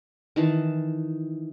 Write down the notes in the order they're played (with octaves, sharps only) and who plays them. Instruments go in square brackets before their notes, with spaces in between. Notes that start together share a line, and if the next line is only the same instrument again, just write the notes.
[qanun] D#3 E3 A5